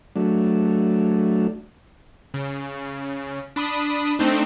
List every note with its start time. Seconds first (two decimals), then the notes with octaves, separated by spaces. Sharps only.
0.16 F#3 A3 D4
2.34 C#3
3.56 D4 B5 D#6
4.19 A3 C4 D4 D#4